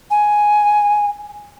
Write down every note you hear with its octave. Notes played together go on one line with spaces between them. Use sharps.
G#5